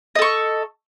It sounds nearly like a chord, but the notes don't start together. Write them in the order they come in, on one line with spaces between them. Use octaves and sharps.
D#5 A4 C#6